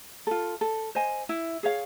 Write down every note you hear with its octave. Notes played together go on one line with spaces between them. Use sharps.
F4 A4
A4
C5 D#5 G#5
E4
G#4 C#5 F5